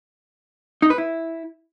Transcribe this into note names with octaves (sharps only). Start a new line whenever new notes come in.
D#4
B4
E4